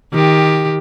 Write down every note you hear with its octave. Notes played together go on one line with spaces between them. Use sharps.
D#3 G4